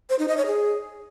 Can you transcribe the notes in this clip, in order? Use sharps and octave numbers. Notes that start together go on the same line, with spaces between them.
C5
D#4
D#5
C#5
G#4